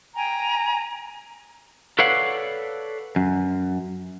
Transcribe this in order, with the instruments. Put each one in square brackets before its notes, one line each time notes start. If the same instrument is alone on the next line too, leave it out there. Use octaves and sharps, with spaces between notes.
[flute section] G5 G#5 A#5
[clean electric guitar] A4 B4 C#5 D5 F5 F#5
F#2